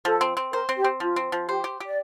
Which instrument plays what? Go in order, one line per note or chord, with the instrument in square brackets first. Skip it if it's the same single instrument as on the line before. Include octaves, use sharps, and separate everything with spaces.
[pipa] F3 [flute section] A4
[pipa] C4
C4
[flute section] A#4 [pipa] C5
[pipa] C4
[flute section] G4
[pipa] C4
[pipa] F3 [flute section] F4
[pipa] C4
F3
[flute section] G4 [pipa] C5
[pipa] G4
G4
[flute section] D5